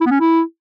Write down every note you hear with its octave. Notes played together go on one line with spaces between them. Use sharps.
E4
B3
C#4
E4